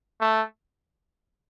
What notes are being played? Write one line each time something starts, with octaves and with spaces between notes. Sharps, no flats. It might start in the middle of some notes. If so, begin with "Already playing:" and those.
A3